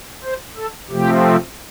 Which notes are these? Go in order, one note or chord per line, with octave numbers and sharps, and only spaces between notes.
C5
A4
C3 F3 A3 C4 G4